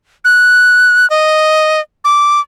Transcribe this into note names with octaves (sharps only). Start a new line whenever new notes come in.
F#6
D#5
D6